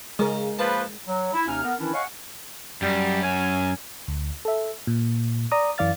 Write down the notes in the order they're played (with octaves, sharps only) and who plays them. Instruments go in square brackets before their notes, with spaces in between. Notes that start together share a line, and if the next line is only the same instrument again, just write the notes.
[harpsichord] C#3 [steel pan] G#3 A#4
[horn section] A#2 F3 B4 [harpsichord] A5
[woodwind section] F#3
E4
D#2 C3 C#4 D#4 G#5 F6
B3 A#4
D#3 E3 C#4 D4 E4
C#5 D#5 F5 F#5 G#5 C#6
[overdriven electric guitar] F#2 [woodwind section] G3
[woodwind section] C#4 G#5
[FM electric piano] D2
A4 E5
A#2
D5 A#5 D#6
F#2 E3 D5 F5 F6 A6